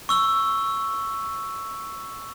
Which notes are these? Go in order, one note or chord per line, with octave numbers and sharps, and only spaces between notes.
C#6 E6 G7